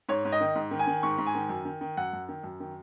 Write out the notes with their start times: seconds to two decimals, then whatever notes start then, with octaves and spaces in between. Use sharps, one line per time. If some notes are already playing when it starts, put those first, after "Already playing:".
0.09 G#2 C#5
0.25 G#2
0.32 D#5
0.41 D#3
0.55 G#2
0.71 D#3
0.79 G#5
0.87 D#3
1.03 G#2 C#6
1.18 G#2
1.26 G#5
1.35 D#3
1.49 F#2
1.65 D#3
1.81 D#3
1.97 F#2 F#5
2.13 F#2
2.29 D#3
2.44 F#2
2.60 D#3